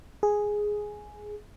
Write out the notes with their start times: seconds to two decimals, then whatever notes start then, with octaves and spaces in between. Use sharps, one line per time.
0.23 G#4